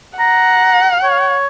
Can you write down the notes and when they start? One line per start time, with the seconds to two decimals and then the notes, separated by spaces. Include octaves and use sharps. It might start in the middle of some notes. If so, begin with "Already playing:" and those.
0.19 F#5 A#5
1.03 C#5